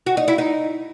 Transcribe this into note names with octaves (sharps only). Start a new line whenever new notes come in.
F#4
D#4
E4
D#4